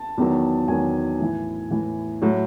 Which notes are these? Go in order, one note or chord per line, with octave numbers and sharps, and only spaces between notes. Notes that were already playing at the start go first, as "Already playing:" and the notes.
Already playing: A5
E2 D#3 F#3
E2 D#3 F#3 G#5
A2 E3
A2 E3
A2 F#3